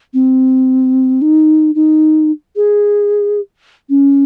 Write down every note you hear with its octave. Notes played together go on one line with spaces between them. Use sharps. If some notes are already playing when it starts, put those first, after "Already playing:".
C4
D#4
D#4
G#4
C#4